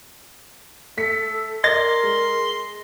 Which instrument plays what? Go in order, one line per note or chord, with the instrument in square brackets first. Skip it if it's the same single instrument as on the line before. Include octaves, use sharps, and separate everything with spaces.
[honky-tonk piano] A3 B6 C#7 [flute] A4
[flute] A#4 [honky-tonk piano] D5 A6 [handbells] D#5 A#6 [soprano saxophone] C6
[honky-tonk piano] G#3